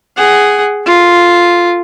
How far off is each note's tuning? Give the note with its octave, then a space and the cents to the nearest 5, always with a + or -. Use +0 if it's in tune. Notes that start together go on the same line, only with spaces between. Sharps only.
G#4 +0 F#5 +20
F4 +0 A4 +0